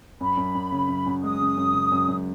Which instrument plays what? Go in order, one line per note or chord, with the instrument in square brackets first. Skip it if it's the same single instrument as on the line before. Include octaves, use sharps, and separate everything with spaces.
[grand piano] F#2 [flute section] B5
[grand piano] F#2
F#2
C#3
F#2
F#2
[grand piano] G#3 [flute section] D#6
[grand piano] C#3
F#2
C#3
F#2
F#2